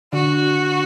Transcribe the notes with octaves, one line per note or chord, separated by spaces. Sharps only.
D3 D4 F#4